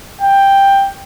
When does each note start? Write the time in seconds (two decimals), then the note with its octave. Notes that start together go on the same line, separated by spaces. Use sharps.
0.21 G5